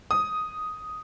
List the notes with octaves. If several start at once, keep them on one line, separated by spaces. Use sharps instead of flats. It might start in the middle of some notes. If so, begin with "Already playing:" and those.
D#6